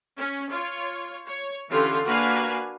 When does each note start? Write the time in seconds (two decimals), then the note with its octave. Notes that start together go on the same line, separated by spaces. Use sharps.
0.18 C#4
0.51 F4 C#5
1.27 C#5
1.70 D3 E3 C#4 F4 G4
2.04 A#3 D4 F#4 B4 F5 G#5